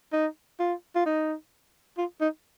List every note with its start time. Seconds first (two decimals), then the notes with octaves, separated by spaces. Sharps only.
0.13 D#4
0.59 F4
0.95 F4
1.05 D#4
1.98 F4
2.21 D#4